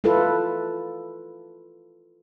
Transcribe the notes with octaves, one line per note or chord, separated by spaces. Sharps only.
E4 F4 A4 B4